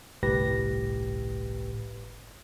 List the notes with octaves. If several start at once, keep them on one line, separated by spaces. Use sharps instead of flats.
G1 C2 A2 G4 B4 A#6